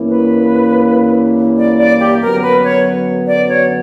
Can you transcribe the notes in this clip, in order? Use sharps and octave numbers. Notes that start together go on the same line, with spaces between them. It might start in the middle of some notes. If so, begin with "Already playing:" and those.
Already playing: G2 E3 A#3 C#4 E4
B4
D5
D5
G4
F#2 D3 F#3 B3 A#4
B4
C#5
D5
C#5